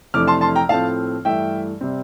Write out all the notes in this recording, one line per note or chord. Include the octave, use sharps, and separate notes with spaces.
F2 C3 E3 A3 D4 D6 F6
A5 C6
A5 C6
G5 A#5
A2 F3 A3 C4 F5 A5
G2 E3 A3 E5 G5
C3 G3 C4